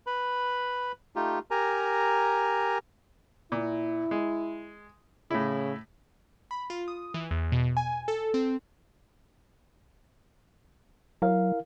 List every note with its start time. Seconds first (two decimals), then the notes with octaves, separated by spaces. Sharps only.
0.07 B4 B5
1.16 A3 D#4 F4 G4
1.51 G4 A#4 G#5 A#5
3.52 A#2 E4
4.11 G#3
5.31 A2 C#3 E4
6.51 B5
6.70 F4
6.88 D#6
7.14 E3
7.31 E2
7.52 B2
7.77 G#5
8.08 A4
8.34 C4
11.22 F#3 E4 A#4 F5